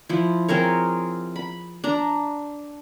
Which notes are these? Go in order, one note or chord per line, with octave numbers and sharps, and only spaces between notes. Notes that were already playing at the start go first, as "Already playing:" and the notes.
F3 E4
C4 G#4 A#4 C#5
B5
D4 A#5